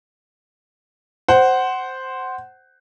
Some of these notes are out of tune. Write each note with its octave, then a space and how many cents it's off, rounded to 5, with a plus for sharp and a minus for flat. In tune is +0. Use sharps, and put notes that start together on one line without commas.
C5 +0 F#5 +15